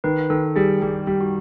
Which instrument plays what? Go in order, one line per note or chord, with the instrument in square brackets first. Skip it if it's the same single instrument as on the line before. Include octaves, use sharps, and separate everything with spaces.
[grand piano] D#3 [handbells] B4
[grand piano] D#3 [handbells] A4
[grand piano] G3 [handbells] G#4
[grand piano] G3 [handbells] G4
[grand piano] G3
[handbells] F#4